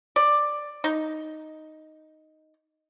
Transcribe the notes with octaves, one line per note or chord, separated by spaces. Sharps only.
D5
D#4